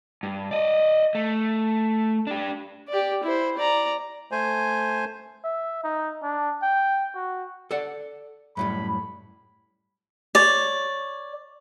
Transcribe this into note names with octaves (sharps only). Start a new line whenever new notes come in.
G2
D5 D#5
A3
D4 G4
G4 D5
E4 C5
D5 A#5
A3 C5 G#5
E5
D#4
D4
G5
F#4
A4 D5 F#5
F#2 A2 G3 B5
C#5 D5